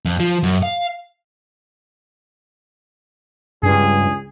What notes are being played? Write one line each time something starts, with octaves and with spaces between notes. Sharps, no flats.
F2
F3
F#2
F5
C#2 G2 G#4